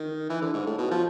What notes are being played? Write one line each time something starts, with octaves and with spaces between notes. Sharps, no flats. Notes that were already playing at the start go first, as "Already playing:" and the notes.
Already playing: D#3
E3
D3
G#2
A2
B2
F3